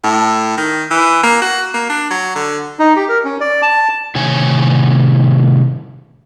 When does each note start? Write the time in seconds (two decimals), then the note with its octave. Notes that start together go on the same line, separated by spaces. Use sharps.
0.04 A2
0.57 D#3
0.91 E3
1.23 A#3
1.42 F#4
1.74 A#3
1.89 D4
2.10 F#3
2.35 D3
2.79 D#4
2.96 G4
3.09 A#4
3.25 C#4
3.40 D5
3.62 A5
4.15 A2 C3 D#3 C#5 G#5